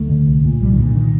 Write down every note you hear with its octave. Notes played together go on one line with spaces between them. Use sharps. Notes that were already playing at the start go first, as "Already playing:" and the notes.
Already playing: D2 A3
D3
C2
A#2
C2 G3
D#3
A#2
D3
D#3